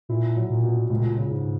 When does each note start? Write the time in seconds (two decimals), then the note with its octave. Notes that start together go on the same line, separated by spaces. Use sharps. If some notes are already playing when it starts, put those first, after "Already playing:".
0.09 A#2 E4
0.36 F#3
0.50 A#2
0.64 B2
0.90 C#2 A#2
1.18 C#3
1.30 G#2